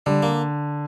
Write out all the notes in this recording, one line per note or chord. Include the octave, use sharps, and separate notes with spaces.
D3 G3
A#3